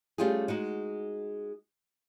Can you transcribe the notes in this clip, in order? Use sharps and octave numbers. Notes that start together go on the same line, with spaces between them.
G3 A3 C#4 F4 G4 G#4
G#3 D#4 F#4